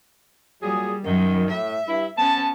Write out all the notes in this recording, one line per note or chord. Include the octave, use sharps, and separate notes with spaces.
A#2 F#3 G3 G#4
F#2 D#3
A2 E5
G2 E4
B3 C#4 A5